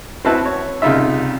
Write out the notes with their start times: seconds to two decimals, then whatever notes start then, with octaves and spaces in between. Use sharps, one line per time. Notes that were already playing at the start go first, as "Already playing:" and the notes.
0.25 C4 E4 F#4 B4 E5 A5
0.45 C#5
0.82 C2 C#3 D#4 F4 E5